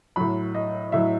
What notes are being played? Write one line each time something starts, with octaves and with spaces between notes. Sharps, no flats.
A2 F#3 B5
D#5
A2 F#3 E5